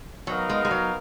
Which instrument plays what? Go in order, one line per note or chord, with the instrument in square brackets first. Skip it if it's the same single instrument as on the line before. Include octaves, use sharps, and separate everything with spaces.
[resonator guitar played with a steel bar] F#3 [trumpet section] B3 D#4 A#4 F5
[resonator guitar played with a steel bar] G#3
G#3
F#3